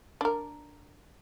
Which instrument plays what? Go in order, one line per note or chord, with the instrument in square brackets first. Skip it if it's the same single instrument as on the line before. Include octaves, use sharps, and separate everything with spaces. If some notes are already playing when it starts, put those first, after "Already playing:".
[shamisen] D4 A#4